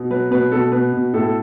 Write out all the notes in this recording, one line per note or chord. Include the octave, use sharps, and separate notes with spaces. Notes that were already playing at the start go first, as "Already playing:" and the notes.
Already playing: B2
F#3 B4
B2 B4
B2 A4
B2 B4
B2
A2 A4
A4